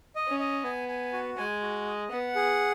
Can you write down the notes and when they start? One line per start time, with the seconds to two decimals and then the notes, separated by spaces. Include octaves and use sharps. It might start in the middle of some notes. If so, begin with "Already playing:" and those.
0.16 D#5
0.28 C#4
0.39 D#5
0.64 B3 G#5
0.89 G#5
1.13 F#4
1.37 G#3 G#5
1.62 F#4
1.87 D#5
2.11 B3 F#5
2.35 G#4